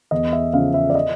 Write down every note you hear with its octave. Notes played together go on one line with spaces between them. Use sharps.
E2 D#5
E5
C#3 F3 F5
E5
D5
D#5